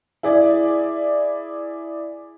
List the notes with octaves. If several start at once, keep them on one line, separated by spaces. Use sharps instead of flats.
E4 G#4 D5